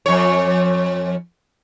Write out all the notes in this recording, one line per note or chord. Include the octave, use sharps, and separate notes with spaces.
F2 C#5